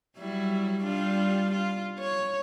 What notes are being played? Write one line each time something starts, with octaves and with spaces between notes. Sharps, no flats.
F#3 G3 E4
G3 D4 F4
F4
C#5